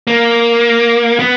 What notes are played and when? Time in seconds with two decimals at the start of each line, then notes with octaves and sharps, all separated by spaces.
0.07 A#3
1.19 B3